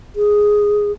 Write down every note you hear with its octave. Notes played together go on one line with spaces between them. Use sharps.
G#4